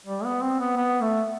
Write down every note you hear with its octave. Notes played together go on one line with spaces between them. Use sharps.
G3
B3
C4
B3
B3
A3